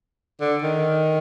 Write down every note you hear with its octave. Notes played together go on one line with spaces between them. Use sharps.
D3
D#3